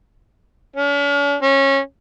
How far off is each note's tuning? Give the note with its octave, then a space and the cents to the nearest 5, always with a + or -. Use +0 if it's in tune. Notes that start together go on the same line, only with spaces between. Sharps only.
C#4 +45
C#4 -20